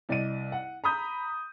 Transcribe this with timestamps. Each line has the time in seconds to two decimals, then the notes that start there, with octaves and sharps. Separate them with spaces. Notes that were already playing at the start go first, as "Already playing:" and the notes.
0.09 C2 D5 D#5 D#7
0.52 F#5
0.84 A#5 B5 D#6 G6